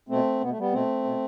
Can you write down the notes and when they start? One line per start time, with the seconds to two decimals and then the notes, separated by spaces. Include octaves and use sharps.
0.09 B2 A3 C4
0.41 B2 B3
0.49 A3
0.58 G3 B3
0.72 B2 A3 C4
1.04 B2